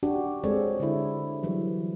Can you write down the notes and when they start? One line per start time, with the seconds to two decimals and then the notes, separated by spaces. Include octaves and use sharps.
0.03 D4 F#4 G4
0.44 G#3 C4 G#4 A4 C#5 D5
0.80 D3 D4 E4
1.43 E3 F#3 G3